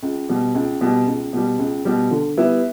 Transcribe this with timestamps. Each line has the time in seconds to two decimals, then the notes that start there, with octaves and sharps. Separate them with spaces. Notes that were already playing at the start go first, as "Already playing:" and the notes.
0.03 C#2
0.29 B2 G3
0.55 C#2
0.81 B2 G3
1.07 C#2
1.33 B2 G3
1.59 C#2
1.85 B2 G3
2.11 D3
2.37 G3 B3 E4